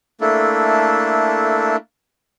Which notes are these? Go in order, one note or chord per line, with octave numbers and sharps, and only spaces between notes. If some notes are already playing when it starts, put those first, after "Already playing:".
A3 A#3 D4 E4 A4